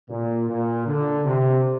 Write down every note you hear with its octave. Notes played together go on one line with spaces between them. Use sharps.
A#2
A#2
D3
C3